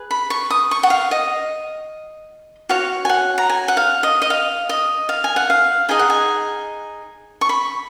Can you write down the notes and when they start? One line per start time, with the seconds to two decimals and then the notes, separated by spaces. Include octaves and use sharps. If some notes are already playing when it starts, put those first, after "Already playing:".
Already playing: G#4 B4
0.11 B5
0.30 C#6
0.50 D#6
0.71 C#6
0.83 F#5
0.90 F5
1.11 D#5
2.69 F#4 C#5 F5
3.05 G#5
3.09 F#5
3.38 A#5
3.50 G#5
3.68 F#5
3.77 F5
4.03 D#5
4.22 D#5
4.30 F5
4.69 D#5
5.09 F5
5.24 G#5
5.36 F#5
5.50 F5
5.89 D#4 G#4 D#5 G#5
5.99 F#5
6.10 G#5
7.41 C#6
7.49 B5